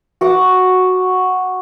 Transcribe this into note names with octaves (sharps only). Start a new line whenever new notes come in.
F#4 F#5 D6